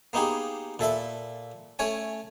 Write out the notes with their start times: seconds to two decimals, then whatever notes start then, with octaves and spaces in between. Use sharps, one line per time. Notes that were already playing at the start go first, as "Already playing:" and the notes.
0.13 A#3 B3 D#4 G4 G#4
0.79 A#2 A4 E5 B5
1.79 A3 C#4 C#5 G#5